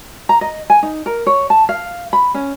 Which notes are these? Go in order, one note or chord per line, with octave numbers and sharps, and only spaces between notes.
A#5
D#5
G#5
D#4
A#4
C#5
A5
F5
B5
C#4